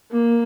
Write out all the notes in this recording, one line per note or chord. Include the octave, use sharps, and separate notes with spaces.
A#3